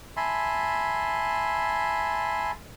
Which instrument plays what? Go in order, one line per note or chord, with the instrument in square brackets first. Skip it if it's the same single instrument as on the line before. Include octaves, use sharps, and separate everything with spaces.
[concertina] E5 G#5 A5 B5 C6